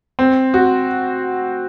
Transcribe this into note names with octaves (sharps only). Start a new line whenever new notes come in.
C4
F#4